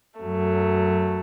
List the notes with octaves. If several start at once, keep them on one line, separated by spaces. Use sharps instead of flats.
F#2 F#3 A3